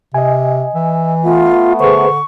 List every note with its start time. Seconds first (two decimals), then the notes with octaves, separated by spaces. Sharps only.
0.14 C3 D#5 G#5
0.75 E3 E5
1.24 A3 B3 F4
1.80 D3 G#4 B4 C5 C#6